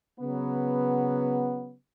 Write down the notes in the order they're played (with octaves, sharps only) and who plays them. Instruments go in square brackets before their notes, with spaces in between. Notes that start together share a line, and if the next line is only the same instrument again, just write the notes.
[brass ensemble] C#3 F#3 B3